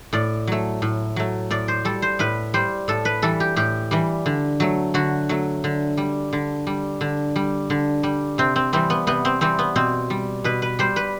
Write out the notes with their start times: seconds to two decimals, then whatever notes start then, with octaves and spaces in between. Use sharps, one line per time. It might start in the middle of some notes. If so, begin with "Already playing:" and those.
0.13 A2 D5
0.47 F#3 A3
0.82 A2
1.16 F#3 A3
1.51 A2 D5
1.68 C5
1.85 G3 A4
2.02 C5
2.19 A2 B4
2.54 G3 C5
2.88 A2 A4
3.05 B4
3.22 E3 G3 A4
3.40 G4
3.56 A2 G4
3.91 E3 G3
4.26 D3
4.60 F#3 A3
4.94 D3 F#4
5.29 F#3 A3
5.64 D3
5.97 G3
6.33 D3
6.67 G3
7.01 D3
7.36 G3
7.70 D3
8.03 G3
8.38 C3 C4
8.56 C4
8.73 E3 G3 C4
8.90 B3
9.07 C3 B3
9.25 C4
9.41 E3 G3 C4
9.59 B3
9.76 B2 C4
10.10 G3
10.44 B2 B4
10.62 B4
10.79 G3 C5
10.96 B4